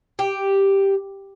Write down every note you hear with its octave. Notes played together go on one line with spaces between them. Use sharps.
G4